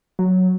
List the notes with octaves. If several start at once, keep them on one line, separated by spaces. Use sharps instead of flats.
F#3